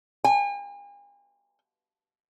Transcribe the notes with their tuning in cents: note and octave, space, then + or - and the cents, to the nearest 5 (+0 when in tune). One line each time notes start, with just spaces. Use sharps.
G#5 -45